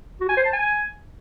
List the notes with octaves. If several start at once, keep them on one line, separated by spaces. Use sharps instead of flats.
F#4
G#5
C5
A5
G#5